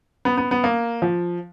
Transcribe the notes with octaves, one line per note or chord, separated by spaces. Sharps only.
B3
B3
B3
A#3
F3